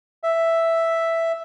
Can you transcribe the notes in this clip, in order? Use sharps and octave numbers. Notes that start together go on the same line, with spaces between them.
E5